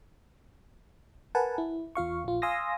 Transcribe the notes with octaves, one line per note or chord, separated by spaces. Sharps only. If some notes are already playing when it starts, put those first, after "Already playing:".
A#4 B4 F#5 G#5 A5
E4
E2 F4 F5 C#6
A#1 F4
F5 G#5 C6 D#6 E6 A#6